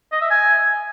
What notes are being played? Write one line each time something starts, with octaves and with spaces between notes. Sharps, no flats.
D#5
E5
G#5